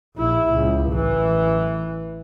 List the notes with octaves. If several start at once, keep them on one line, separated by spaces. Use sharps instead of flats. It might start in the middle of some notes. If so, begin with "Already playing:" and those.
A#1 E4
C#2
A1 E3